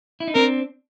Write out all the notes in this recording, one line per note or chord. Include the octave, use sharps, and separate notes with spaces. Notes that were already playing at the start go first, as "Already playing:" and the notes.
E4
D#4
C4 D4 A#4